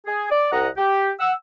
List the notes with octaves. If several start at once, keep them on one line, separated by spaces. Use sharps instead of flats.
G#4
D5
C2 D#5 F#5 A#5
G4
F#5 E6